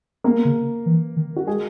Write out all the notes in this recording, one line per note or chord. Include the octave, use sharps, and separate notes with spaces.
A#3 B3 A#4
C#3
E3
D#3
F#4
G#3 G#4